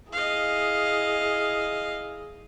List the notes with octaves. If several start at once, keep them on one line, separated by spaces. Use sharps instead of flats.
E4 G#4 D#5 F5